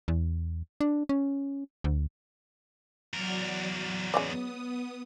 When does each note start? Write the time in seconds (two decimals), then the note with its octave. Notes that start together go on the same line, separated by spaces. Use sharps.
0.08 E2
0.81 D4
1.09 C#4
1.84 D2
3.13 E2 F#3 F#4 A#4 D5
4.14 G#3 B3 C#4 D5 D#6